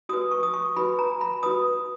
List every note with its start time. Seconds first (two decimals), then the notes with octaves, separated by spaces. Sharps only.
0.09 F#4 B4 D#6
0.31 C#6
0.43 D#6
0.54 C#6
0.76 F#4 B4 B5
0.99 A#5
1.21 B5
1.43 F#4 B4 D#6